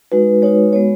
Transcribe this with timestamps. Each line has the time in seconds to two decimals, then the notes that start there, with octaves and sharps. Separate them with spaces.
0.12 G#3 D#4 F#4 B4
0.42 G#3 D#4 F#4 C#5
0.73 G#3 B3 F#4 C#5